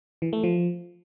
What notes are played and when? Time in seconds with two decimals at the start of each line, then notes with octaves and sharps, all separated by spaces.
0.22 E3
0.33 A3
0.43 F3